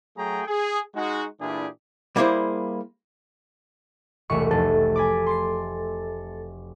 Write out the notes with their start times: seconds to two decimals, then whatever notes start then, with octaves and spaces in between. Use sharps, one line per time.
0.16 F#3 A3 F#4 G#4 G5 A#5
0.46 G#4
0.95 G#3 D#4 F#4
1.39 A#2 E3 D4 E4 G4 G#4
2.16 G3 A#3 B3 E4 G#4 C5
4.30 E1 C2 A3 C#6
4.51 F1 A4
4.96 G#5 B5 D6
5.26 C6 D6 C7